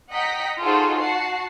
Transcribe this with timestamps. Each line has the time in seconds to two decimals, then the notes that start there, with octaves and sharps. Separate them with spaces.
0.12 D#5 F#5 G5 A#5 B6
0.62 D#4 F4 F#4 G#4 A4 C5
1.00 F#4 F#5 A5 C7